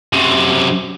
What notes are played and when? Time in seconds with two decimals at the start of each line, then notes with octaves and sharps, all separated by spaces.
0.13 F#2 C3